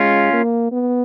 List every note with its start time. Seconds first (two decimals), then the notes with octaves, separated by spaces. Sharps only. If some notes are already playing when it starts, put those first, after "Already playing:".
Already playing: G#3 C#4 F4
0.33 A#3
0.72 B3